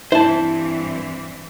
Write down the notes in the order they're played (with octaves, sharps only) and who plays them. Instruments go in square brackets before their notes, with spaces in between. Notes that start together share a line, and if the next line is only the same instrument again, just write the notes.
[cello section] G2 E3 C4 [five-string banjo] E4 [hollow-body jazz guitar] C5 A5